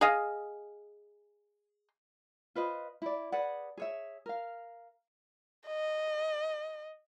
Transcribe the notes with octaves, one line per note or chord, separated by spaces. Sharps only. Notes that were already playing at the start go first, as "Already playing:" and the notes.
G#4 D#5 F5
F4 B4 C5 D#5
E4 D5
G#4 B4 D5 F#5
G#4 C#5 E5
A#4 F5
D#5